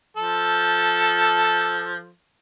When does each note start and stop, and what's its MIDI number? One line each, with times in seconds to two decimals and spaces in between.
0.17 2.09 53
0.17 2.09 69